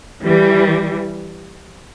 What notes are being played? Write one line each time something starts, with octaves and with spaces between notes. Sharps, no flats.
E3 G3